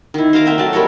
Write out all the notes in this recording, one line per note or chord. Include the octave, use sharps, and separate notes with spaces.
D#3 E4
C5 F5 A#5 D6
C4 E5 G5
F#3 A3 A5
G3 G#3 A#4 C#5